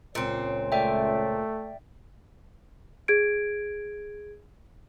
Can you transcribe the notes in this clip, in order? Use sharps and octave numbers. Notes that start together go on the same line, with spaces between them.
C#2 A#2 C4 C#5
A3 D5 E5 G5
G#4 G#6 D7